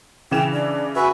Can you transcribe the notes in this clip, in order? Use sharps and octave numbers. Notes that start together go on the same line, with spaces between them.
C#3 E3 G5 E7
D4
F#4 B4 E5 G#5